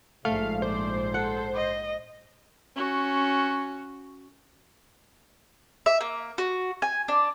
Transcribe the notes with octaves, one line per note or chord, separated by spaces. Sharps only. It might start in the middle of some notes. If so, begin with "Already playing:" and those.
A#1 G#2 A3 F5
C5 D5
A4 F#5
D#5
C#4 F#4
E5
A#3
F#4
G#5
D4